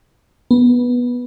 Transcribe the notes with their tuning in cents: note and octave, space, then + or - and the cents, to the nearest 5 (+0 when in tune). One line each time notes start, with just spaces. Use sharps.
B3 -10